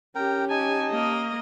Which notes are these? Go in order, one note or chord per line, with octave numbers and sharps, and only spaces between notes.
C#4 G4 A#4 G5
D#4 G#5 A5
A#3 D#5